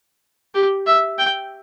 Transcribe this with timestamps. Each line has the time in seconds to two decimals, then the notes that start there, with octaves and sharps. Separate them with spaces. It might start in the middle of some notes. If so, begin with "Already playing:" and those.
0.55 G4
0.86 E5
1.18 G5